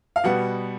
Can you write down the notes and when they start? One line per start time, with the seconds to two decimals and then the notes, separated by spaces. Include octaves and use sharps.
0.16 F5
0.24 B2 G3 B3 F#5